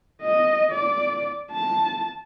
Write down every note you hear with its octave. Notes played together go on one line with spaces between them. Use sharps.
D#5
D5
A5